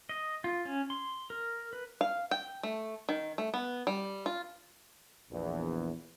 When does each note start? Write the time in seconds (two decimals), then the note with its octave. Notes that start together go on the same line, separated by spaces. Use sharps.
0.09 D#5
0.44 F4
0.65 C#4
0.90 C6
1.30 A#4
1.73 B4
2.01 F5
2.31 G5
2.63 A3
3.09 D#3
3.38 A3
3.54 B3
3.87 G3
4.26 F4
5.30 A#1 E2